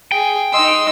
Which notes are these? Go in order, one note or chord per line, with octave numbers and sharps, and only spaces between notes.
G#4 G5
D#4 D#5 C6 E6